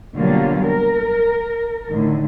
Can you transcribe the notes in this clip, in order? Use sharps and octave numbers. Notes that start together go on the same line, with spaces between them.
B2 D3 F#3 G3 A#3 F4
A#4
A2 D3 D#3